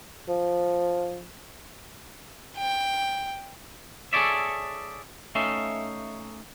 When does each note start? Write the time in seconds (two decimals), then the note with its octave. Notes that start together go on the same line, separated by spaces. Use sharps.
0.28 F3
2.58 G5
4.13 G#4 A4 C#5 D5 E5
5.35 A3 C#4 D#4 E5 F5